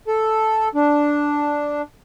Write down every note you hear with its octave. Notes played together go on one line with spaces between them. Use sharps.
A4
D4